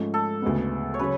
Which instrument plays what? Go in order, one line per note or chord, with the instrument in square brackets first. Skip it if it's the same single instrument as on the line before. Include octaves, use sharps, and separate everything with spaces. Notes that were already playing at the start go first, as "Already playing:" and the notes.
Already playing: [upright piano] G#2 F3 A3 C#4
[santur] A4
[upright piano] D2 C#3 G#3 B3
[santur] C#5
[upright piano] C#3 F#3 [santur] B4